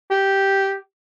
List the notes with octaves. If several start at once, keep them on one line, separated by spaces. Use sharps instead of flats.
G4